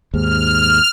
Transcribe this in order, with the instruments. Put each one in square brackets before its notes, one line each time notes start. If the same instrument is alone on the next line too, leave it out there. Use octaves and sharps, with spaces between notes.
[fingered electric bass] D#2 G#2 [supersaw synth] F6